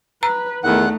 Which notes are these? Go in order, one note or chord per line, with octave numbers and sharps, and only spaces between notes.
B4 A#5
E2 D#3 A3 D#4 F#5